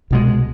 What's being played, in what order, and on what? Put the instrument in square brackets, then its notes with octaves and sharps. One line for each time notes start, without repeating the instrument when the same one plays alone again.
[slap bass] C2 B2 G#3